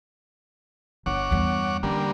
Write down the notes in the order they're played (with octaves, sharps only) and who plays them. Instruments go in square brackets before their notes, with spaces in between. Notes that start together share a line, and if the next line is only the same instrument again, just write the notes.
[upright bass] G1 [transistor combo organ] C#5 F#5 D6
[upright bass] E2 G2
[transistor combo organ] D3 G3 A#3 [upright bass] C#4